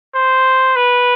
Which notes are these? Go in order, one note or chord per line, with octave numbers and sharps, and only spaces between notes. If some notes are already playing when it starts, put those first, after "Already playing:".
C5
B4